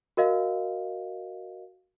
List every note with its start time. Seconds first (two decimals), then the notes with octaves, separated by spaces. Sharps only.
0.17 F#4 A#4 D#5 F5